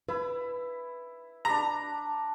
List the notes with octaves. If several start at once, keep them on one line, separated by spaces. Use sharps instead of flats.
E4 B4
D4 A#5 B5